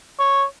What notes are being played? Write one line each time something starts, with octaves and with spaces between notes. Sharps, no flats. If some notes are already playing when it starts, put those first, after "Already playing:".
C#5